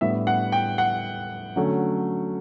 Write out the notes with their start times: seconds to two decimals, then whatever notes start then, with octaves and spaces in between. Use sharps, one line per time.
0.01 A2 G3 B3 D4 E5
0.27 F#5
0.52 G5
0.78 F#5
1.56 D3 F#3 A3 C#4